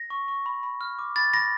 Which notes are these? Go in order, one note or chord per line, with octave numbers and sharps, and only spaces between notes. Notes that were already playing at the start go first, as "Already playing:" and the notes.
Already playing: A#6
C#6
C#6
B5
B5
F6
D6
B5 A6
B5 A#6